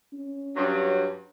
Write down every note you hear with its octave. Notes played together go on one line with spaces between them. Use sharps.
C#4
G2 F#3